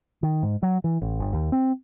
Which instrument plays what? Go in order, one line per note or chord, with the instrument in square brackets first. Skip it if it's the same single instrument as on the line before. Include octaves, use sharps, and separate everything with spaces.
[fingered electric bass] D#3
G#2
F#3
E3
A1
G1
D#2
C4